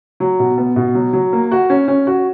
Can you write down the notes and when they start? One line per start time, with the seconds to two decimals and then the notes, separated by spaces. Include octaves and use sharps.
0.20 F#3
0.39 B2
0.58 B3
0.76 B2
0.95 F#3
1.13 F#3
1.33 A#3
1.51 F#4
1.70 C#4
1.88 C#4
2.07 F#4